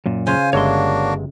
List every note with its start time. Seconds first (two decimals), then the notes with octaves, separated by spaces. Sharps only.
0.06 F#2 A#2
0.27 C#3 F4 C5 G#5
0.53 G1 G#3 A#3 D4 F#4 C#5 E5 C6